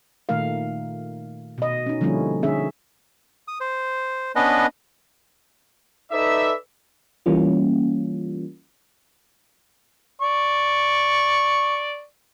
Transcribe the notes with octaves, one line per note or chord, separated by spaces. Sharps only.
A#2 D#3 A3 D#4 A#4 F5
B2 D#5
C#4 D#4
D3 F3 G3 A#3 C#4 E4
D3 C#4 D#4 G#4 E5
D#6
C5
B3 C#4 D4 B4 D#5
D#4 A4 B4 D5 E5
E3 G3 A#3 C#4 F4
D5 C#6